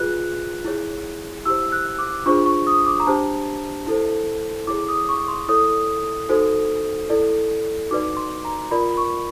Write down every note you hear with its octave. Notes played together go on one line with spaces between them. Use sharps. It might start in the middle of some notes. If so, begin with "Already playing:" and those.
Already playing: F4 G#4 B4 F#6
E4 G#4 C#5
E4 G4 C5 E6
F#6
D6
D4 F4 G#4 C5 C#6
C#6
D#6
D6
A#5
D4 G4 C5 A5
E4 A4 C5
E4 G#4 C#5 D6
D#6
C#6
C6
E4 A4 C#5 D#6
D#4 F#4 A4 C5
E4 A4 D5
D#4 F#4 B4 D5 D6
C6
A#5
F4 A#4 D5 B5
C#6